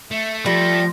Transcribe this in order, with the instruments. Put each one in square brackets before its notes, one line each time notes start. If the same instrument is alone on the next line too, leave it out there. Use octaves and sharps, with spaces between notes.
[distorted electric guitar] A3 [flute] E5
[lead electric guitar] F3 [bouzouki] G3 [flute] A#6